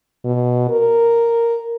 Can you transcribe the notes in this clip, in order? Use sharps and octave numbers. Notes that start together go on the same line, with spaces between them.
B2
A#4